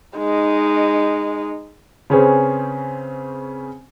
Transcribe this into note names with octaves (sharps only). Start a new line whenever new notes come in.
G#3 D#4
C#3 C4 C#4 G#4 B4 C5